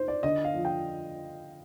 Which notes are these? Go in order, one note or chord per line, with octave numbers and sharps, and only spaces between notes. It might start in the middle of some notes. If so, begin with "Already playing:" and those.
Already playing: D#4 C5
D5
D3 D#5
F5
F3
G5